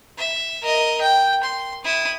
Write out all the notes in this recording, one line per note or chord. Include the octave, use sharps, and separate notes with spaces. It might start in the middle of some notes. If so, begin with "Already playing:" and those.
E5
A#4 D#5
G5
C6
E4 D#6